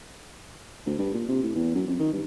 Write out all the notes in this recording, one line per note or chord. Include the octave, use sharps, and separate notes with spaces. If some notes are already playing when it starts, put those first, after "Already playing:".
D2
G2
A#2
C3
A2
E2
F#2
F2
D#3
G2